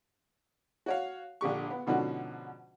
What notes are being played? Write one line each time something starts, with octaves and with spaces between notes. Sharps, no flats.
F#4 C#5 F5
A#1 D3 G4 C#6
B3
G#2 B2 D3 F3 C#4 F#4